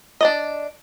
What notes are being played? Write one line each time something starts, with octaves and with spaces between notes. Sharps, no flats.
D4 D5 D#5